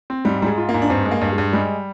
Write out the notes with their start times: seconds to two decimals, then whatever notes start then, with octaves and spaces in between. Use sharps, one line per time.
0.10 C4
0.25 G#2 G3
0.42 G#2 G3
0.46 G#3
0.58 F4
0.69 A#3
0.74 G#2
0.82 D4
0.90 G2 C4
1.05 G#3
1.11 A#3
1.21 G2
1.33 G#3
1.38 G2
1.53 G3 G#3